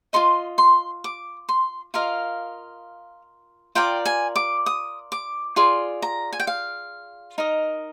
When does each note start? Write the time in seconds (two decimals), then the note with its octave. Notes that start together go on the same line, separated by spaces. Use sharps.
0.13 F4 A#4 D#5 C6
0.58 C6
1.04 D6
1.49 C6
1.94 F4 A#4 D#5 F5
3.75 F4 A#4 D5 G5
4.06 G#5
4.36 D6
4.66 D#6
5.12 D6
5.56 F4 G#4 D5 C6
6.02 A#5
6.33 G#5
6.40 G5
6.47 F5
7.38 D#4 A#4 D#5